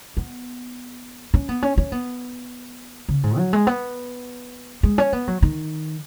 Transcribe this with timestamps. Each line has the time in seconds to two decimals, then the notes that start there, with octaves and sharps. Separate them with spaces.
0.17 B3
1.34 C#4
1.49 B3
1.63 C#4
1.78 C#4
1.92 B3
3.09 C#3
3.23 G#2
3.37 F#3
3.53 G#3
3.67 B3
4.83 G#3
4.98 C#4
5.13 B3
5.28 F#3
5.42 D#3